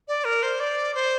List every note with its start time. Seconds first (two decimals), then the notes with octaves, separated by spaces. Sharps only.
0.08 D5
0.25 A#4
0.43 C5
0.60 D5
0.95 C5